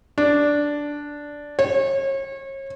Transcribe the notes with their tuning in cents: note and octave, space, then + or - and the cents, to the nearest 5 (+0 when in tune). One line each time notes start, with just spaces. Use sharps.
D4 -5
C#5 -35